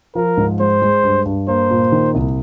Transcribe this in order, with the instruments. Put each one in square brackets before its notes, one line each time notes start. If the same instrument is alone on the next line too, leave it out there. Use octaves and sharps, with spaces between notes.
[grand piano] F3 [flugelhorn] A#4
[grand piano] G#2
[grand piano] G#3 [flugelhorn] C5
[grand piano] G#3
G2
G2
[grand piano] A#3 [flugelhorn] C5
[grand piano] A#2
D#3
C2